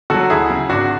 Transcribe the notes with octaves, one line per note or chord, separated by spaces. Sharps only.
D3 F#3 F#4 A4
D2 E4 G#4
C#3 F#3
G#1 D4 F#4